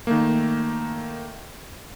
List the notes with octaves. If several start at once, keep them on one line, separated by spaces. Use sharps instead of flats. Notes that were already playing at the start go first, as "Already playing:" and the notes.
D#3 A3 A#3